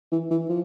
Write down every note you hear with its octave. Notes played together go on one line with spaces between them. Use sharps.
E3
E3
F3